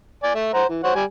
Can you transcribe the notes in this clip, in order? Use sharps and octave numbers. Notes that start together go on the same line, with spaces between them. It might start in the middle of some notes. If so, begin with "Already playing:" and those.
D5 G#5
A3 E5
C5 F#5 A#5
E3
C5 C#5 F#5
G3 G#5